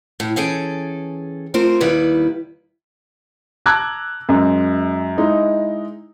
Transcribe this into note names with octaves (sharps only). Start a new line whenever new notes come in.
A2
E3 C#4 G#4 A4 G5 G#5
A3 C4 F4 A#4 C5
D#2 D#3 G3 E4 B4
A5 A#5 D6 E6 F#6 G#6
F#2 G#3
G#3 D#4 E4